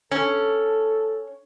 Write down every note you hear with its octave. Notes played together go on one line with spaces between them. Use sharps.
C#4 A4